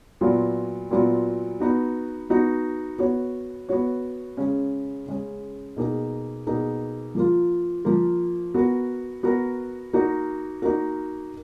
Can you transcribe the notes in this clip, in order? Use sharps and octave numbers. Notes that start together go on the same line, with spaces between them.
A#2 F#3 B3 F4
A#2 F#3 B3 F4
B3 D#4 F#4
B3 D#4 F#4
B3 F#4 C#5
B3 F#4 C#5
C#3 G#3 C#4
C#3 G#3 C#4
B2 A#3 D#4 G#4
B2 A#3 D#4 G#4
F3 A#3 F4
F3 A#3 F4
B3 F#4 A#4
B3 F#4 A#4
A#3 D#4 F#4 A#4
A#3 D#4 F#4 A#4